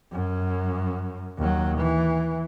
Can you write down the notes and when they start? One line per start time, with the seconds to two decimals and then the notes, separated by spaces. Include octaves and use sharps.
0.12 F#2
1.38 D#2 F#3
1.78 E3